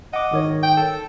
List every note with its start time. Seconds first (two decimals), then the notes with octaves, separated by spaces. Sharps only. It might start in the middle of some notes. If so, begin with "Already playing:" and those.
0.13 D#5 F#5 D6
0.31 G#1 D#3 C#5
0.63 G5
0.77 A4